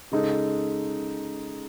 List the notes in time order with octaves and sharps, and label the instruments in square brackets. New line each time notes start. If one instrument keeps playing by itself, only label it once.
[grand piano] C#3 G#3 D#4 A4